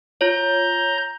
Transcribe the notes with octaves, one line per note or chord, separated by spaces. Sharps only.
F4 C#5 A#5 G6